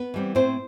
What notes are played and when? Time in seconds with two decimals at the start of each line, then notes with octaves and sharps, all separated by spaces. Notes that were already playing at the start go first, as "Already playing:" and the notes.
Already playing: B3 B4
0.14 E3 G3 C4
0.35 A2 C4 C5